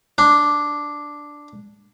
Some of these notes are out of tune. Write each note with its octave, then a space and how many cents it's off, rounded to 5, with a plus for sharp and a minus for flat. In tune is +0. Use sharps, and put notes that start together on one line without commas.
D4 +0